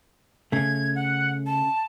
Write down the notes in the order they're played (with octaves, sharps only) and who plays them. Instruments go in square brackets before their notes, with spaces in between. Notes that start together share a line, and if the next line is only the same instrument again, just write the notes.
[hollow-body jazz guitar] C#3 A3 [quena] G#6
[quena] F#5
A5